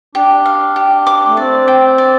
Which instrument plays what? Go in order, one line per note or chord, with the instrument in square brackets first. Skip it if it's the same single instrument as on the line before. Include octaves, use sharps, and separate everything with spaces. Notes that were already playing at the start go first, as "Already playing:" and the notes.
[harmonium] D4 [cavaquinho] G4
[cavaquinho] F5
G4
D6
[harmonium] A3
[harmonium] C4 [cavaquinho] D5
[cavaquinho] G5
D5